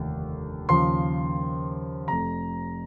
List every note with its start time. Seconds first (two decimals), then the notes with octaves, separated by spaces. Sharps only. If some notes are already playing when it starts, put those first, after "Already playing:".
Already playing: F1 D#2 D3
0.69 D#2 C#3 F3 C6
2.08 F1 F2 C3 A#5